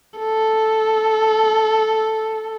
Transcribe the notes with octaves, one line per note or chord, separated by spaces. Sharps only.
A4